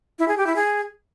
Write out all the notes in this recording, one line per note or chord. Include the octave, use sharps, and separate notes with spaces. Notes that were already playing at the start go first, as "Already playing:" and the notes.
E4
G#4
G4
E4
G#4